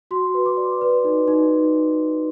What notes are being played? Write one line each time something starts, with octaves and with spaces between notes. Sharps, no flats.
F#4 C6
B4
D6
D5
B4
D#4
D#4